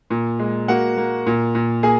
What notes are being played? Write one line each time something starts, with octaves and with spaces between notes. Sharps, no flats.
A#2
G#3
A#3 F#4 F#5
A#3
A#2
A#2
A#3 G#4 G#5